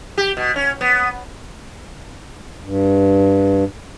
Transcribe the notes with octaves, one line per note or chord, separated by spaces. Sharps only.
G4
B2
C#4
B3
G2